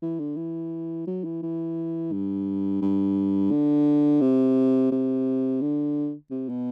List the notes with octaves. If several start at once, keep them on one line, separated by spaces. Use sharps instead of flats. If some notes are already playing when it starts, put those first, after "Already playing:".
E3
D3
E3
F#3
E3
E3
G2
G2
D3
C3
C3
D3
C3
B2